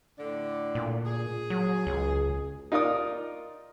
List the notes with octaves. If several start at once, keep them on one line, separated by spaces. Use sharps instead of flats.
A2 D3 D4
A#2
G#4
F#3
C#2
D#4 F4 A#4 D5 D#6